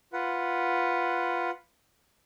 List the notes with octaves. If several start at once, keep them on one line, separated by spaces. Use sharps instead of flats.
F4 B4 F#5